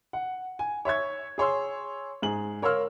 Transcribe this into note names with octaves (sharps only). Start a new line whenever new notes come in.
F#5
G#5
C#5 E5 C#6 G#6
G#4 C#5 C6 E6
G#2 G#4 F#7
A#4 C#5 F5 C6 E6 F6